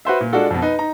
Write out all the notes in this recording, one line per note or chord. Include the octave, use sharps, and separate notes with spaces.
F#4 B4 C5 E5
A#2
G#3 D4 F4 F#4 A4
F2 B2
D#4 B4
D#4 A#5